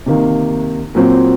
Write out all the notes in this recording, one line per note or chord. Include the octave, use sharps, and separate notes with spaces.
C3 D#3 A#3
A#2 F#3 C4